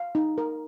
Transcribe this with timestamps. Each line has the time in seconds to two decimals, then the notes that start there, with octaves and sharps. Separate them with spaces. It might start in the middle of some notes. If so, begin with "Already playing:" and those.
Already playing: F5
0.15 D#4
0.38 A#4